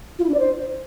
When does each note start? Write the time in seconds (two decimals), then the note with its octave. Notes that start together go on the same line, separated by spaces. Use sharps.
0.19 F4
0.24 E4
0.29 D4
0.34 D5
0.39 C5